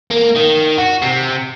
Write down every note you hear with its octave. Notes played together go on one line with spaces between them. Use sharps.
A#3
D#3
F#4
C3